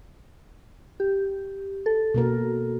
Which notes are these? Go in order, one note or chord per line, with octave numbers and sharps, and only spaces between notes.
G4
A4
B2 A#3 A#4